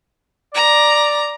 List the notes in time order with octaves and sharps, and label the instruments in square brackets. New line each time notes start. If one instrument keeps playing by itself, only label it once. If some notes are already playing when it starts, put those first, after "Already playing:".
[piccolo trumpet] D5 [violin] A#5